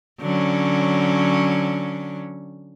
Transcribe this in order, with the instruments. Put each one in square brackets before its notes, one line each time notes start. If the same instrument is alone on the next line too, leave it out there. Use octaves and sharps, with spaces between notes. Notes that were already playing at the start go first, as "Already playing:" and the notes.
[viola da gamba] D3 F#3 C#4